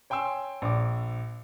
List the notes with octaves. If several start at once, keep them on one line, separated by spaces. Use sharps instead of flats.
C#5 G5 G#5 C6 E6
A#1 D6